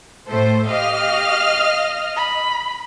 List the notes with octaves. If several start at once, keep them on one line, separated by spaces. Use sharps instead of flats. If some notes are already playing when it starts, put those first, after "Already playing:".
A2 A4 C5
G4 D#5 F5 F6
B5